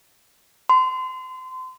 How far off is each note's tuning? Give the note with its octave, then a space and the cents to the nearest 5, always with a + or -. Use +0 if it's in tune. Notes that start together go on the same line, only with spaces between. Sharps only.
C6 -30